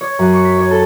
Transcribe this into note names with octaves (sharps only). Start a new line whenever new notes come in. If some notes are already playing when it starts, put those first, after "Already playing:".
C#5
F#2
C#6
B6
C#5
A4